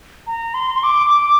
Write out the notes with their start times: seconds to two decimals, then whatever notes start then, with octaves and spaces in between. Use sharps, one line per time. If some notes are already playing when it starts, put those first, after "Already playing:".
0.27 A#5
0.54 C6
0.74 C6
0.83 D6
1.10 D6